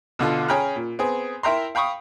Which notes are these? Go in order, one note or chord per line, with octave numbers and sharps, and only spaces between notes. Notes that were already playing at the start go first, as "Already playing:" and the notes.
B2 D3 F4 A4
C#4 G#4 G5 A#5 B5 F6
A#2
B3 C4 G#4
E4 A#4 E5 G5 A#5 C6
F5 G5 B5 C#6 D#6